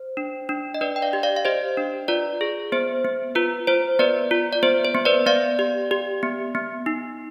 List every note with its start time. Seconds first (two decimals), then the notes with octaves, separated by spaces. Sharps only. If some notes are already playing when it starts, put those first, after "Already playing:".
Already playing: C5
0.17 D4
0.49 D4
0.74 D#5
0.81 D4 B4 D5
0.96 G5
1.02 D5 F5
1.13 G4
1.23 D5 F5
1.36 F5
1.45 G4 C5 D#5
1.77 D4
2.08 F4 B4 D5
2.41 G#4
2.72 B3 C5
3.05 B3
3.35 F4 B4
3.67 F4 C5
3.99 B3 B4 D5
4.31 F4
4.53 D5
4.63 B3 C5
4.85 C5
4.95 B3
5.05 B4 D5
5.26 B3 D5 F5
5.59 G4
5.91 G4
6.23 B3
6.55 B3
6.86 D#4